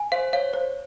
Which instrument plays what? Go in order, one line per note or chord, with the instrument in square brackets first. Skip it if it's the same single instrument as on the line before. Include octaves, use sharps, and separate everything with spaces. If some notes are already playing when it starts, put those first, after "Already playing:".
Already playing: [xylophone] G#5
[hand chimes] C5 [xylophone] F5
[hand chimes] C#5 [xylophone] F5
[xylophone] C5